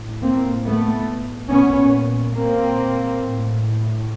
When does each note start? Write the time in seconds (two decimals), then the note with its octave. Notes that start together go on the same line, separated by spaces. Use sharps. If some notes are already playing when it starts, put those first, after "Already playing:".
Already playing: A2
0.22 A#3 C4
0.65 A3 B3
1.50 A#2 B3 C#4
2.35 A#3 C4
3.20 A2